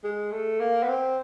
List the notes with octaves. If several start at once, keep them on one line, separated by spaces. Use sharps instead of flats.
G#3
A3
A#3
B3
C4